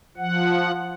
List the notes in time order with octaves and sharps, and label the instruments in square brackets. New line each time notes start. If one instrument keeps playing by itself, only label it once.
[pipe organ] F3 F#5